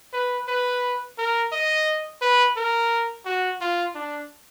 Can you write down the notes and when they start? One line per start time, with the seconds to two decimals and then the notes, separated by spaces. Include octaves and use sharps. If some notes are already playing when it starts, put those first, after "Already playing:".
0.13 B4
0.48 B4
1.18 A#4
1.52 D#5
2.22 B4
2.57 A#4
3.26 F#4
3.61 F4
3.95 D4